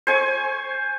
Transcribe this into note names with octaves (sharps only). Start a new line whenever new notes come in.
C5 G#5 C#6